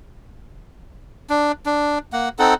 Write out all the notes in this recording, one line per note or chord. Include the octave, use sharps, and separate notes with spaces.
D4
D4
A#3 F#5
C4 D#4 A4 F#5